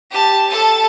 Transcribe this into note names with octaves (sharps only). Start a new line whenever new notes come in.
G4 A5
A4 A5